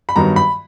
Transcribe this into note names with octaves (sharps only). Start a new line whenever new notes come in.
B5
G2 D#3 F#3 B3 A#5
B5